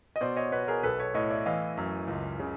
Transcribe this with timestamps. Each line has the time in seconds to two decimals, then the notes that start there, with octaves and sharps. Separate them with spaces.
0.16 D#5
0.21 B2 C5 D5
0.36 C#5 D#5
0.52 B2 B4 C#5
0.68 G#4 A#4
0.83 B1 A4 B4
0.99 B4 C#5
1.14 A2 C#5 D#5
1.30 D5 E5
1.46 E3 D#5 F5
1.77 F#2
2.08 C#2
2.39 C#3